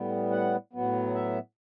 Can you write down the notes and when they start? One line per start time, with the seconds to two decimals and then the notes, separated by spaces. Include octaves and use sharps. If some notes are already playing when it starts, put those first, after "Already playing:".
Already playing: A2 G3 B3
0.31 F#5
0.73 A2 F#3 B3
1.14 E5